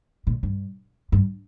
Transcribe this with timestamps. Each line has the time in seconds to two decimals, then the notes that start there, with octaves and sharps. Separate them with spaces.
0.27 A#2
0.43 G2
1.12 G2